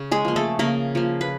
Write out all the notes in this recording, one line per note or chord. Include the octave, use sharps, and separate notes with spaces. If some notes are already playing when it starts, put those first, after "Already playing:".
Already playing: C#3
G#3 G#4
F3 A#3
A3 A4
C#3 A#3 A#4
F3 A#3
B4